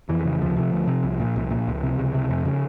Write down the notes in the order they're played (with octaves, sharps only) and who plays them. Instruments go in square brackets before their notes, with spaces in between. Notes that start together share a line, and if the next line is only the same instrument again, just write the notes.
[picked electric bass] F2 E3
C#3
D2 F3
C3
D2
C3
C2
A#2
C2
A#2
C#2
C3
C#2
C3
F2
C#3